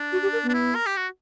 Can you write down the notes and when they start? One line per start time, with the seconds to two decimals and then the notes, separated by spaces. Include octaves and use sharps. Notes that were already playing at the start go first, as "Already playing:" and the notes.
Already playing: D4
0.12 F#4
0.22 G4
0.33 A#4
0.43 B3
0.49 D4
0.54 E4
0.75 A#4
0.86 G4
0.97 F#4